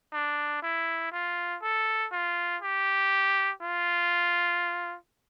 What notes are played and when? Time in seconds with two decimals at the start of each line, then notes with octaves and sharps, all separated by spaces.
0.13 D4
0.63 E4
1.12 F4
1.62 A4
2.12 F4
2.62 G4
3.62 F4